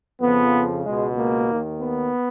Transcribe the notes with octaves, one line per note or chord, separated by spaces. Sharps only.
F2 C#3 F3 B3
C#2 B2 G#3
A#3
D#2 D#3
B3